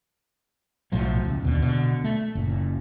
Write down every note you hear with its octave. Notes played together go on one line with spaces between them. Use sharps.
B1 A2 F3 F#3
C#2
D#2 B2 D3
B2 D3
A3
F#1 A#2